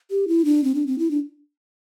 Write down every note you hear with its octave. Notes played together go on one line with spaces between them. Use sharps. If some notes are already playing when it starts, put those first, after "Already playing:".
G4
E4
D4
C4
D4
C4
E4
D4